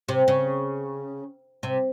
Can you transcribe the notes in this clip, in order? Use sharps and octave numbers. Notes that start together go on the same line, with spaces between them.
C3
C#3
C3